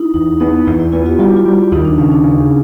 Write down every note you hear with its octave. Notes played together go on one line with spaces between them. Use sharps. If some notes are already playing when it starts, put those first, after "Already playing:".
Already playing: D#4 E4
E2 D#4
B3 D#4
E2 E4
E4
B3 F4
F4 G4
G3 E4 F#4
F4
G3
D#2 D#4
D4
C#3 C#4
D4
C#3